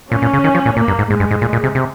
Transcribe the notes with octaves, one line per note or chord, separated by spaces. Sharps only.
A#2 C#4
A#2
C#3
D#3
F3
A#2
A#2 A#3
G2
G#2
G#2 G#3
G2
G#2
A#2
A#2
C3
C3